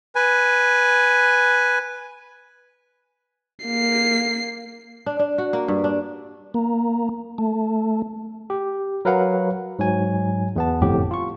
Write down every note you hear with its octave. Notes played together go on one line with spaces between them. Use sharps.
B4 G#5
A#3 C7
D4
D4
F#4
A#3
G2
D4
A#3
A3
G4
F#3 A#4 B4 F5 F#5
G#2 F#3 G#5
E2 B3 A5
G1 F2 A2 G4
F4 C#6